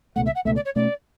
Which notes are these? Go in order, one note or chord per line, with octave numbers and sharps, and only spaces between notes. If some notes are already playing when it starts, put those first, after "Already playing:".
C#2 B2 A3 F#5
E5
F#5
C#2 B2 A3 E5
D5
C#5
B2 A3 C#4 D5